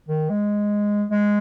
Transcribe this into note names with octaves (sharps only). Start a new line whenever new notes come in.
D#3
G#3
G#3